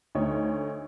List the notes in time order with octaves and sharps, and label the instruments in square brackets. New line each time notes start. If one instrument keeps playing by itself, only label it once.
[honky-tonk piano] D2 D3 D#4 C#5